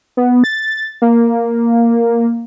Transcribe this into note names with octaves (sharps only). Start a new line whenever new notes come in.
B3
A6
A#3